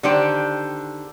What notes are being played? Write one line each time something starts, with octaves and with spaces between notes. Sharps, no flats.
D3 D#3 D4 G4 C5